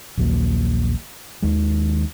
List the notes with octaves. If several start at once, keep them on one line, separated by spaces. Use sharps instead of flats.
A#1 D#2 F#3 A#3
D#2 D#3 G#3